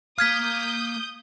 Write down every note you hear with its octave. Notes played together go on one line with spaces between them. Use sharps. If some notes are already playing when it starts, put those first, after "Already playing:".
A#3 F5 D#6 F6 G6 G#6 B6